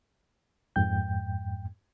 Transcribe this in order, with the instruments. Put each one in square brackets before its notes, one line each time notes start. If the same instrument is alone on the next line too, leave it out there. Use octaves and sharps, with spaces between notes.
[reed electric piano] F2 G#2 G5 G6